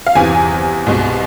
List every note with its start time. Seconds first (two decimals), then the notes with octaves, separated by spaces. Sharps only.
0.07 F5
0.15 E2 C3 E3 G#5
0.86 C2 B2 G#3